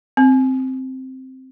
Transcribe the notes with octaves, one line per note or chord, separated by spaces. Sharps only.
C4